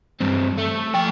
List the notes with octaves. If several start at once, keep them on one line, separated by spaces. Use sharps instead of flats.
G2 C4
A3
F3 G5